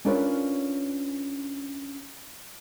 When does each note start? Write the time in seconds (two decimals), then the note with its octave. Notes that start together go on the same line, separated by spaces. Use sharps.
0.05 C#4 D4 F4 A#4 B4 C#5